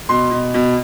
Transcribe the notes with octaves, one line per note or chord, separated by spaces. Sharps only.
B2 C6
B2
B2